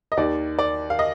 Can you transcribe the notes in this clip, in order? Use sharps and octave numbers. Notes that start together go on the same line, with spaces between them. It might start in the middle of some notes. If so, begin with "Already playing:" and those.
D#5
D#2 D#3 D5
D5
F5
D#5